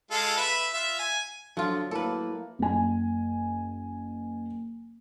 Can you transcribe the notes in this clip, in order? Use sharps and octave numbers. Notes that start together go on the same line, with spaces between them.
G#3 F4 A4
B4 E5
F4 E5
G#5
D3 F3 F#3 F4
A2 A#3 A4 B4
F#1 G#5